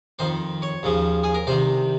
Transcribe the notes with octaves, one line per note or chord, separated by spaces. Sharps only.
F2 D#3 C5
C#5
D#2 C#3 F3
G#4
A#4
C2 C3 D#3 C5